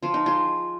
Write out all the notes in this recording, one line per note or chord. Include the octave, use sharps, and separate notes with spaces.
F3 F4
D#4
G#3 F4